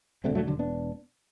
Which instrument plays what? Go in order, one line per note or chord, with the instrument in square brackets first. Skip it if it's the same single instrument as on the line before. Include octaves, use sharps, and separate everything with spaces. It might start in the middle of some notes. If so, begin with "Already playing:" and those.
[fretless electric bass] E1 D2 D3 A3 C4
F#3 A3
D3 F#3
B3 D4